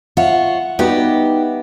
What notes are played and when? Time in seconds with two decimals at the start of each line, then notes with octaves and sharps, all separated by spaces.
0.17 F4 C#5 E5 F#5
0.79 G3 B3 D#4 F#4 G4